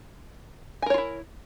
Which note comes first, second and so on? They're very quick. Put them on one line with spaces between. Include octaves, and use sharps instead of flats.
G#5 A#4 C#5 F4 E4